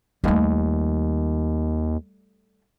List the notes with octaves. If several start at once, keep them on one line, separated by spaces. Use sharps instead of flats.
D#2 G3 A3